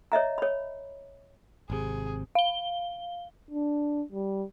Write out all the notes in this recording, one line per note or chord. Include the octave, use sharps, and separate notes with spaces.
C#5 D#5 E5 A#5
C#5 B5
G#1 C3 G#4
F5 G7
D4
G3